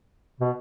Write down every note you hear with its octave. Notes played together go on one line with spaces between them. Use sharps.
B2